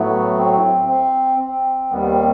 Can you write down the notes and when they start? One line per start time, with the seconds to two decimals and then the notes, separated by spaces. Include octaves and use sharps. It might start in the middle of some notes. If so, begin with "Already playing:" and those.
Already playing: A2 F#3 A3 B3
0.37 C4
0.89 C4
1.39 C4
1.91 D#2 D#3 G3 B3
2.02 B3
2.08 C4